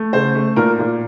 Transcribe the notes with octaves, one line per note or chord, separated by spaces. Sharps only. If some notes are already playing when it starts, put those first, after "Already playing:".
Already playing: A3
C#3 C5
A3
A#2 A#4
A#2